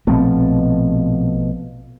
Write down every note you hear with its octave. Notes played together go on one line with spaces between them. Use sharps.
A#1 B2 F3 A3 C4